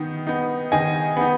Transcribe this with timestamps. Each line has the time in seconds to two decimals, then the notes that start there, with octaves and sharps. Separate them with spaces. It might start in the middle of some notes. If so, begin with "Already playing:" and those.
Already playing: D#3 B3 D#4
0.27 B3 D#4
0.72 D#3 D#5 G#5
1.17 B3 D#4